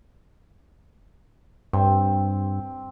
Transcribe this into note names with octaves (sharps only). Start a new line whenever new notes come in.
G2 C4